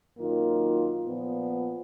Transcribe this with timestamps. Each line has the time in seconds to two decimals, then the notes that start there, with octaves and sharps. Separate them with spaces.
0.18 F#2 D#3 A#3 F4
1.06 A#2 F3 B3